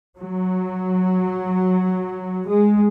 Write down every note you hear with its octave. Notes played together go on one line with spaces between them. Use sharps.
F#3
G#3